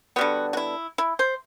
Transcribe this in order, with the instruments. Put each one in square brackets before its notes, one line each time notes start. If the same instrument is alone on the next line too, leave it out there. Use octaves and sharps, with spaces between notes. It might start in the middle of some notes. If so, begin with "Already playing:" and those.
[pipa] D3 G3 B3 F#4
F#4
E4
E4
C5